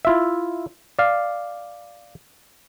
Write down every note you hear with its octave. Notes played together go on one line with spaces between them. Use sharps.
E4 F4 E5
D5 F5